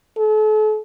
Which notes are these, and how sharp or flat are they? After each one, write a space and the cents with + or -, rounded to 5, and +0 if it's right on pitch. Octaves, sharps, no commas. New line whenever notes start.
A4 -40